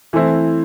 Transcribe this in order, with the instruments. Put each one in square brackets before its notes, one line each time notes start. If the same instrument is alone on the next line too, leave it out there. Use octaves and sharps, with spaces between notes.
[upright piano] E3 A3 C4 E4